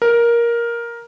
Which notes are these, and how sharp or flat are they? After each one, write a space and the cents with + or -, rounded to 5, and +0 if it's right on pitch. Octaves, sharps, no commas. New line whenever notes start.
A#4 +10